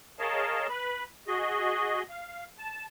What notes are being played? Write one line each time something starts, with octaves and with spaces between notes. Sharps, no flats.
G#4 A#4 C#5 D#5 F5 A5
B4 B5
F#4 G#4 D#5
F5
A5